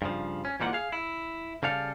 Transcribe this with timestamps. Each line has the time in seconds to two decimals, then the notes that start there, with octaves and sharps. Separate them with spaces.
0.02 G2 C#3 F3
0.45 C#4
0.60 G#2 E3 G3 A#3 F4 F#5
0.73 G#4 F5
0.92 E4
1.63 C#3 G3 A4 F5